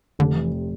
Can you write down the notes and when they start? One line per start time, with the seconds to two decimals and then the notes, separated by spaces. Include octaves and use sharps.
0.19 F1 D3
0.36 E3
0.52 C3